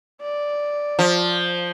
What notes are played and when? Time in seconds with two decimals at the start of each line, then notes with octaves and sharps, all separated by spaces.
0.22 D5
0.99 F3